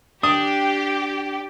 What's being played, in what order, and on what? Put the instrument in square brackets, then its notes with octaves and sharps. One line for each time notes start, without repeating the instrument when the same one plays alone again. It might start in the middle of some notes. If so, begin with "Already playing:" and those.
[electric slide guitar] D4 [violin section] G4 [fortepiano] D#6